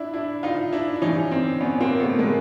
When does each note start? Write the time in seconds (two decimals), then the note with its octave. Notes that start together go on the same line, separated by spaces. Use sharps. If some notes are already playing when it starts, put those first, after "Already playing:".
Already playing: D4 E4
0.14 D4 E4
0.43 D#4 F4
0.72 D4 E4
0.96 D4
1.02 G2 E3 C#4 D#4
1.31 C4 D4
1.61 B3 C#4
1.80 A#3 C4
1.95 A#3
2.00 A3 B3
2.19 G#3 A#3